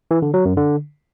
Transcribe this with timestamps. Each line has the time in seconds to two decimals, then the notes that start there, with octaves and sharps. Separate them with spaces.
0.11 E3
0.22 D3
0.34 F#3
0.45 F#2
0.57 D3